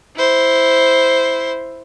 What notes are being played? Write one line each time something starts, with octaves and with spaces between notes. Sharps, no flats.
E4 C5